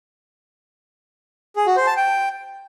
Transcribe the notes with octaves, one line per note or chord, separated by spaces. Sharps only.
G#4
F#4
C5
A5
G5